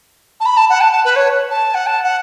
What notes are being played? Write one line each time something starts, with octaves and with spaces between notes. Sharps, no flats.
A5
B5
A5
F#5
A5
A5
B4
C#5
A5
F#5
A5
F#5